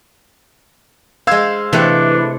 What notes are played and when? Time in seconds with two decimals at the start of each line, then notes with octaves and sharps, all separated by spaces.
1.27 G#3 C5 F5 E6 G#6
1.73 C3 E3 A3 D4